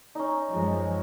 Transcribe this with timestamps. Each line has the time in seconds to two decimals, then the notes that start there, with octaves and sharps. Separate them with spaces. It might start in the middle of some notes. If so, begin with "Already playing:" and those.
0.15 C#4 D#4
0.50 F#2 F3 G#3